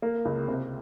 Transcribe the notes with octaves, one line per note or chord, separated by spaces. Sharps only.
A#3
C#2
C3